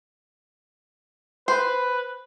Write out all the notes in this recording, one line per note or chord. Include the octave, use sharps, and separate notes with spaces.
B4 C5